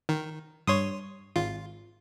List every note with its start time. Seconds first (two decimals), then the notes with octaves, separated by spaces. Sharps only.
0.09 D#3
0.67 G2 C#5 C6 D#6
1.36 G#1 F4